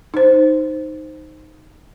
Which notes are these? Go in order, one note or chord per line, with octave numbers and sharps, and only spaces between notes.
D#4 C5